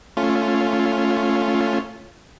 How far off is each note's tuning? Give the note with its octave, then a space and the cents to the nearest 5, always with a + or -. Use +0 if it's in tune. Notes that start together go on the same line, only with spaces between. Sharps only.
A3 +0 C#4 +0 F4 +0